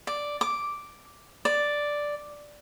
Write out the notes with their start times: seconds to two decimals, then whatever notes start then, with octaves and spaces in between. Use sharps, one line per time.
0.07 D5
0.41 D6
1.45 D5